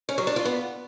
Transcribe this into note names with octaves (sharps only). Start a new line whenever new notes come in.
C#4
F#3
D4
F4
B3